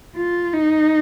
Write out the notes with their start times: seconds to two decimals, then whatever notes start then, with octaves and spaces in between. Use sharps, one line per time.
0.16 F4
0.54 D#4